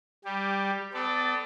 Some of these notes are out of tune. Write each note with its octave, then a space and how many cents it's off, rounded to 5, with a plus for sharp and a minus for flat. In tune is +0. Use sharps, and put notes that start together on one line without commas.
G3 +0 G4 +10
B3 +45 A4 +0 D5 +0